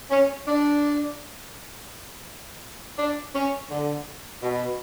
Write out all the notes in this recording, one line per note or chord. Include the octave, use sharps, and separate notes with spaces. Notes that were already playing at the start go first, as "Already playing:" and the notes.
C#4
D4
D4
C#4
D3
B2